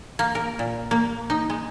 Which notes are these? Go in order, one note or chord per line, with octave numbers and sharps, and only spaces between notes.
A#3
A#4
A#2
A#3
D#4
G#3